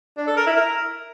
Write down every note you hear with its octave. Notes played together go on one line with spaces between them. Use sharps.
D4
A4
A#4
E4
A#4